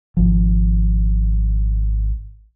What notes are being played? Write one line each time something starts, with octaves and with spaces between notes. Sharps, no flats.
G#1 F3